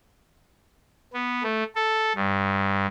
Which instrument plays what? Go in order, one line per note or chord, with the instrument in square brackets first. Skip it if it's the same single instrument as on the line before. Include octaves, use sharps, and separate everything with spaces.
[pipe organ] B3
A3
A4
G2